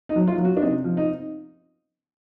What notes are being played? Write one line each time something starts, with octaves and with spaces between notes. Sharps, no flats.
D#4
F#3
F4
F#3
F#4
D4
C3 D#4
F3
D#4